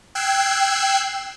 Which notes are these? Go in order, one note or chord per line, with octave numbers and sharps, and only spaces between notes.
G5 E6 F#6 G#6 C7